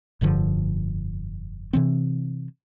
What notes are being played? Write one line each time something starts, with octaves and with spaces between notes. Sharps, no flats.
F1 G2 D3 F3
C3 E3 C4